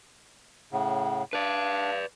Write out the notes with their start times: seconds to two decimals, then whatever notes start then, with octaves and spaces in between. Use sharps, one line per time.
0.72 A2 C#3 F#5
1.33 D4 B4 D5 F5